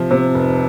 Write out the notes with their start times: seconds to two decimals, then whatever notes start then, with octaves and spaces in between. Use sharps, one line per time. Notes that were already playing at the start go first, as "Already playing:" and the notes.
Already playing: C3 F3
0.11 C3
0.34 F1